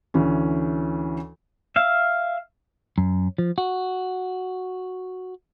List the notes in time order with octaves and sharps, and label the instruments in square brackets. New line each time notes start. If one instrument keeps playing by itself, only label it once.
[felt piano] D2 E3 C#4
[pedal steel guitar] E5 F5
[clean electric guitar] F#2
F3
F#4